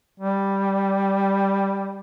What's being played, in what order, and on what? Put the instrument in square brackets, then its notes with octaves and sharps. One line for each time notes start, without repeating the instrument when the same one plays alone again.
[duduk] G3